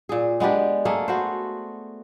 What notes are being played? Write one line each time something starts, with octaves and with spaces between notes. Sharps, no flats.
A#2 G#4
G#3 B3 D4 G4
A3 A#3 G#4
B3 F#4 C5